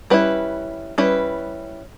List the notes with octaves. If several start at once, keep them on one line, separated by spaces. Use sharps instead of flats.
G3 C#4 E4 B4
G3 C#4 E4 B4